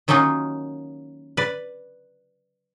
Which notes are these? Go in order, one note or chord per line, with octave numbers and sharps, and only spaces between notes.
D#3 F#3 A#3 C#4 D#4 F4
B4 D5